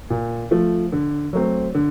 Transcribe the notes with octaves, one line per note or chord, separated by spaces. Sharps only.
A#2
F3 A3
D3
F#3 A3 C4
D3